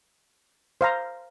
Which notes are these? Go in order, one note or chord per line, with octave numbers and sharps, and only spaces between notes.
C5 F5 A#5